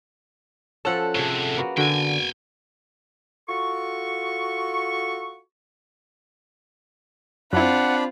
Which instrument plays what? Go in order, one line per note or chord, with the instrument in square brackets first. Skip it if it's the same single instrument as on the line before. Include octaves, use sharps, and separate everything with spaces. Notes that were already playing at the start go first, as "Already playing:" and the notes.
[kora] F3 C#4 [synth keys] A4 F#5
[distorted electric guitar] A2 C3 [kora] G#4 C#5
[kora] A#3 B3 F#4
[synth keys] D3 [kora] F#4 [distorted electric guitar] G5 G#5
[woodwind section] F4 F#4 A4 C#6
[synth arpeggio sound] F#2 E4 [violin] C4 F4 [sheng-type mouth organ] D4 B5 [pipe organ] F#5